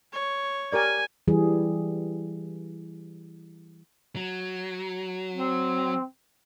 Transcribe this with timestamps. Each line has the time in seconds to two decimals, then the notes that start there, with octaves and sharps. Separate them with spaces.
0.13 C#5
0.73 G4 A#4 D5 G#5
1.28 E3 G3 G#4
4.16 F#3
5.34 C4